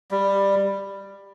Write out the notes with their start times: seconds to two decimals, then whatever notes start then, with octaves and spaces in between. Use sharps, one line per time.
0.11 G3